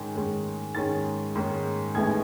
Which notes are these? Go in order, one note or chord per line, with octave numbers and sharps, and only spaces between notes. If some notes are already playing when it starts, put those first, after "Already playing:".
Already playing: G#2 D#3 G#3 C#4
G#2 D#3 G#3 C#4
G#2 D#3 G#3 C#4 A6
G#2 D#3 G#3 C#4
A1 A2 G#3 B3 D#4 G#6